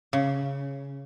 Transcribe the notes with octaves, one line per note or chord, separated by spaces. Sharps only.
C#3